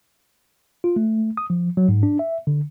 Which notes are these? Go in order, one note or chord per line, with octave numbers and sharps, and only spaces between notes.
F4
A3
D#6
F3
F#3
G#2
D4
E5
D3